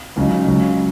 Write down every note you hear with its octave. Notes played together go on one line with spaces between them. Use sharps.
C#2 C#3 F#3 D#4
C#2 C#3 F#3